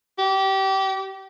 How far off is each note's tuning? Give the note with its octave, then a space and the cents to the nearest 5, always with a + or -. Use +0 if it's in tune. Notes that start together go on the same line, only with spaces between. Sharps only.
G4 -25